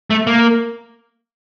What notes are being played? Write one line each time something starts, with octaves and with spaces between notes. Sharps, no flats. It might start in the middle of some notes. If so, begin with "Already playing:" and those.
A3
A#3